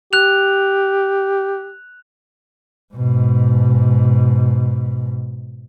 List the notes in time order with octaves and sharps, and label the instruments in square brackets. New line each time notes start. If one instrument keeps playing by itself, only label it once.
[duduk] G4 [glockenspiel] F#6 F7
[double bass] G#2 B2